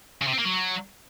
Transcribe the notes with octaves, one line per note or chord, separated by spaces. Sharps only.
C#3
C3
C4
A#3
F#3